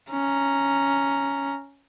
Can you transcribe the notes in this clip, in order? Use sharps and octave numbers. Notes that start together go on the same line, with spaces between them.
C#4 A#5